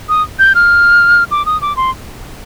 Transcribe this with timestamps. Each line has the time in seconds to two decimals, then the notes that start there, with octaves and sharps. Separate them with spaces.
0.09 D#6
0.39 G6
0.55 F6
1.31 D6
1.46 D#6
1.61 D6
1.77 C6